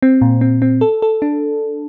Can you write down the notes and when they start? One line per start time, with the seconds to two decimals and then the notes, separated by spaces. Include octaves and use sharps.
0.02 C4
0.21 A#2
0.41 C4
0.62 C4
0.81 A4
1.02 A4
1.22 D4